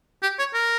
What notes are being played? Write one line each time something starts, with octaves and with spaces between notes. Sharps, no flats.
G4
C#5
A#4